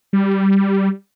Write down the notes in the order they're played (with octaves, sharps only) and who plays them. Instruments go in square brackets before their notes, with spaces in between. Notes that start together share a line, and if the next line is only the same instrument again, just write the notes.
[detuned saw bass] G3